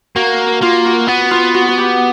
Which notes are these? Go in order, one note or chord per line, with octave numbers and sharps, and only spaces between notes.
A#3 F#4
A#3 F4
F#4
B3
F4
F#4
F#4
G4